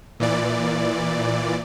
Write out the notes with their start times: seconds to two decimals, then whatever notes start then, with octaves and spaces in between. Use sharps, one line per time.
0.20 A#2 E3 D5